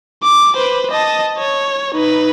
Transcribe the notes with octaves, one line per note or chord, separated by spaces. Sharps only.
D6
B4 C5
D#5 A5
C#5
D#4 B4